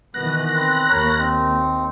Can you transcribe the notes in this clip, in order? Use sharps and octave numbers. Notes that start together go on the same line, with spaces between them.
B2 D#3 E3 B3 F#6 A#6
C4 B4
D#2 A#3 A#4 C#5 B5
C4 D#4